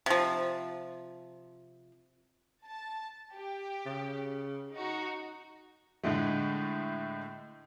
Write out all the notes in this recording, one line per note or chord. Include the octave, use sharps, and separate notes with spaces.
C3 F3
A5
G4
C#3
D#4 F#4
A2 D3 G#3 A3